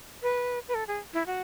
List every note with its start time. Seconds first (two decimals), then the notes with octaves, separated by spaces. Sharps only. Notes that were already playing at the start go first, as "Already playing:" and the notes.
0.22 B4
0.68 B4
0.74 A4
0.88 G#4
1.13 E4
1.26 F#4